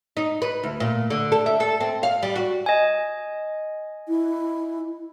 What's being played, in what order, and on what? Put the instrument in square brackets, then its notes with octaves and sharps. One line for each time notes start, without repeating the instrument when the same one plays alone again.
[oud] D#4
B4
D2
A#2
D3
A4
E5
A4
C4
F5
G3
F#4
[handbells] D#5 G#5
[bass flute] E4